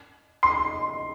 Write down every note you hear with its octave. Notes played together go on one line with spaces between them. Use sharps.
C6